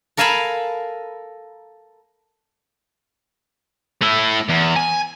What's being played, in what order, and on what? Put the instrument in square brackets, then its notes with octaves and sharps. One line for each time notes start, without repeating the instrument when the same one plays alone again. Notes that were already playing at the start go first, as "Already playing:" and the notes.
[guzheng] A4 A#4 F5 G#5 A5 B5
[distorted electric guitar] A3 E4
E2
G#5